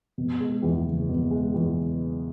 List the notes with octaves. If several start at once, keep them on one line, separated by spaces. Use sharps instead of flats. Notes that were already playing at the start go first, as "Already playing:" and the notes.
B2
G#3
E2
F#1
B2
G#3
E2